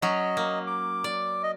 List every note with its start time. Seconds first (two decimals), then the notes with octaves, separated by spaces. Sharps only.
0.02 F#3 C#4 D#5
0.37 A#3
0.67 D6
1.04 D5
1.43 D#5